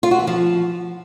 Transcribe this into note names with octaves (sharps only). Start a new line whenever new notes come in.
F4
F#4
E3
F3